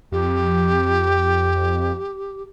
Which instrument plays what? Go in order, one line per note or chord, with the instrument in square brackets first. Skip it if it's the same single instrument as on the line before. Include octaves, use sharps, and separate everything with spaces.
[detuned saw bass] F2 [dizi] G4